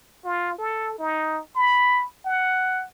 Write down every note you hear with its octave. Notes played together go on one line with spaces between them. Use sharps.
F4
A4
D#4
B5
F#5